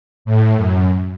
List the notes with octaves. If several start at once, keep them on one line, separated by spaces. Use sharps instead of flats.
A2
F#2